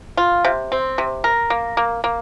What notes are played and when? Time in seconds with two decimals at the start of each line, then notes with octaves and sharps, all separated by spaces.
0.17 F4
0.45 C3
0.72 C4
0.98 C3
1.24 A#4
1.50 A#3
1.77 A#3
2.04 A#3